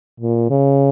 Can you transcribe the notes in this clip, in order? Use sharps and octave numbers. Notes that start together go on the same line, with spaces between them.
A#2
C#3